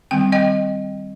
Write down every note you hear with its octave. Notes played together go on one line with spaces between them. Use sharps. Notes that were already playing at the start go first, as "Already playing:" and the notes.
D#3 G3 C4 G5
D#5 G5